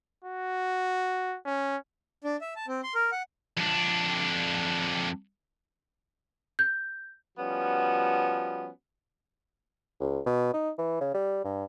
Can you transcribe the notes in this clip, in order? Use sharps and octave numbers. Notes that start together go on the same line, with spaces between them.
F#4
C#4
D4
E5
A5
C4
C6
A#4
F#5
F2 D4
G6
F3 G3 B3 C#4 F#4
C#2
B2
D#4
E3
C#3
G3
G2